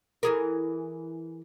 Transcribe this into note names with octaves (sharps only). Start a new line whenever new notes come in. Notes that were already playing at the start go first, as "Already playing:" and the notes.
E3 G#4 A#4